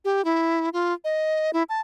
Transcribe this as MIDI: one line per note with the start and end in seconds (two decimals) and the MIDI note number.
0.05 0.24 67
0.25 0.69 64
0.73 0.93 65
1.04 1.51 75
1.53 1.63 64
1.69 1.81 81